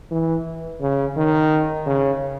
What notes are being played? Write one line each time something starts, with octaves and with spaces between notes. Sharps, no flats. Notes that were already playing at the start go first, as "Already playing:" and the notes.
E3
C#3
D#3
C#3